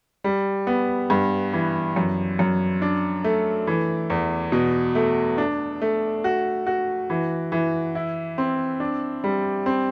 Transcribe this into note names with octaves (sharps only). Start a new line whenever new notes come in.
G3
B3
G2
E3
F#2
F#2
D4
A3
E3
E2
B2
A3
D4
A3
F#4
F#4
E3
E3
E4
C4
D4
G3
C4